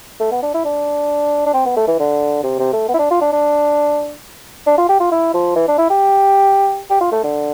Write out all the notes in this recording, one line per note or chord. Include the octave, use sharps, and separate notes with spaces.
A3
B3
D4
E4
D4
D4
C4
B3
A3
E3
D3
C3
C3
A3
B3
E4
D4
F4
D4
D4
D4
F4
G4
F4
E4
F3
E3
D4
E4
G4
G4
F4
A3
D3